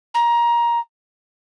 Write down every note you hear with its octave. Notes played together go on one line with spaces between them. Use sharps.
A#5